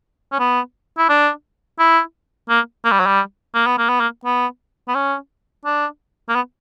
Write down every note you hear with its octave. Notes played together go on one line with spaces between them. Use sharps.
C#4
B3
E4
D4
E4
A#3
A#3
G3
F#3
G3
A#3
B3
A#3
B3
A#3
B3
B3
C#4
D4
A#3
B3